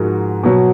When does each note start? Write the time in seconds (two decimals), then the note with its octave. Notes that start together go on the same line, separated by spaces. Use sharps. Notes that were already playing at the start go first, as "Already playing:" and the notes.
Already playing: G#2 F3 G#3 F#4 A#4
0.43 B2 F#3